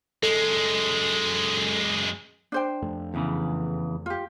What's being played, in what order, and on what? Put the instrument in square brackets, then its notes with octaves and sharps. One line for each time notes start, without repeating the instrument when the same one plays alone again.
[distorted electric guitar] F#2 G#3 [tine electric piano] A4
[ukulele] D4 C5 G5
[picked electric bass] F2 A3
[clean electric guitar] E2 C#3 E3
[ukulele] F4 G4